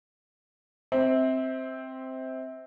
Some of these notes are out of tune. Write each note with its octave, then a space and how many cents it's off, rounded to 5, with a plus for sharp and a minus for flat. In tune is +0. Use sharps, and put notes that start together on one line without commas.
C4 +0 E5 -30